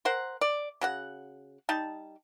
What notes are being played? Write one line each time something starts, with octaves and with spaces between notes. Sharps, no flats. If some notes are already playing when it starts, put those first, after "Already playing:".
A#4 C5 F#5
D5
C#3 F#4 F#5
G3 D#4 A5